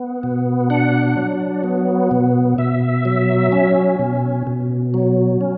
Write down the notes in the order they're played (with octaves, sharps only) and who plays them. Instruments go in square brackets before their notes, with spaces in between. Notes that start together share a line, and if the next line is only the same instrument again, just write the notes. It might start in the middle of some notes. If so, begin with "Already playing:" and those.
Already playing: [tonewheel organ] B3
B2
D4 F#5
F#3
B3
B2
B2 E5
F#3
C#4
B2
B2
F#3
C#4